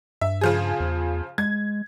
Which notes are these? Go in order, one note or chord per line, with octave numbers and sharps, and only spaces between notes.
G2 E5
C#3 F3 G#4
E2
G#3 G#6